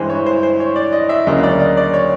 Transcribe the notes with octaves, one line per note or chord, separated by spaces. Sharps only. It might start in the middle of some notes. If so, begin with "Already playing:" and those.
Already playing: G2 E3 G#3 C5
C#5
C5
C5
C#5
D5
D#5
E5
D2 C#3 F#3 A#3 D#5
D5
D#5
D5
C#5